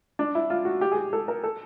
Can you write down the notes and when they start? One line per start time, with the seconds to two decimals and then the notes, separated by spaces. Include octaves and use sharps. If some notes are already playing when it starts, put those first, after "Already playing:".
0.19 D4
0.35 E4
0.50 F4
0.65 F#4
0.81 G4
0.92 G#4
0.97 G4
1.13 A4
1.28 A#4
1.44 A4